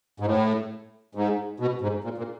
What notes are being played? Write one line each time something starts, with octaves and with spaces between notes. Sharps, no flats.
G#2
A2
G#2
B2
G#2
A#2
A#2